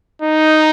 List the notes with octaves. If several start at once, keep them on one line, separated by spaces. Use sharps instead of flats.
D#4